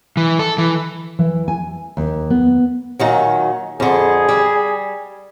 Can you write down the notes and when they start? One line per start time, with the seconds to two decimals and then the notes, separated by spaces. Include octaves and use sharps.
0.17 E3
0.39 A4
0.58 E3
1.19 E3
1.48 G#5
1.97 D#2
2.30 B3
2.99 A#2 D#3 F#3
3.80 F2 D3 G#4
4.29 G3